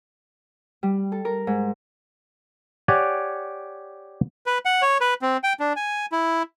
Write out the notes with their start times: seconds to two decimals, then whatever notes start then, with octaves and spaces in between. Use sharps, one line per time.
0.83 G3
1.12 A4
1.25 A#4
1.47 G#2
2.88 G4 C#5 D5 F#5 G#5
4.46 B4
4.65 F#5
4.82 C#5
5.01 B4
5.22 C4
5.44 G5
5.60 D4
5.76 G#5
6.12 E4